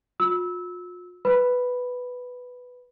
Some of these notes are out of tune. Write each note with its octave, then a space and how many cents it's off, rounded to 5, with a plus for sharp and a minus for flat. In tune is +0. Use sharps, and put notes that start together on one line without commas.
F4 +40 E6 -20
B4 +5 B5 +0